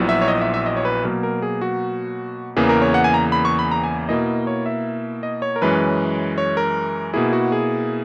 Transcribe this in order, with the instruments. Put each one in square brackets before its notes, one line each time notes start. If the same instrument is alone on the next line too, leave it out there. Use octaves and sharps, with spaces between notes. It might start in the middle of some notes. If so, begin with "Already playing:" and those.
Already playing: [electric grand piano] A#1 A#2 F#3 B3 E4
E5
C#5
D#5
E5
E5
D#5
C#5
B4
B2 F#3 A#3 A#4
A#4
G#4
F#4
E2 C#3 E3 A#3 G#4
A#4
C#5
F#5
G#5
A#5
B5
C#6
B5
A#5
G#5
B2 A#3 E4 D#5
C#5
E5
D#5
C#5
A#4
F#2 E3 G#3 C#4 B4
C#5
A#4
B2 A#3 E4 G#4
F#4
G#4